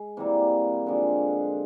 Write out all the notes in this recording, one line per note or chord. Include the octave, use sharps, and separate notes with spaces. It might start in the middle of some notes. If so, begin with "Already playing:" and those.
Already playing: G#3
C3 E3 G3 A#3
D3 F3 G#3 C4